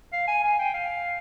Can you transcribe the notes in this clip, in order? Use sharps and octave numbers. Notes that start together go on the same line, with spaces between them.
F5
G#5
G#5
G5
F5